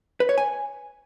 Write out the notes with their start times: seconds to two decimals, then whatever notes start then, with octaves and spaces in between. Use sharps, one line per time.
0.20 B4
0.29 C#5
0.38 G#5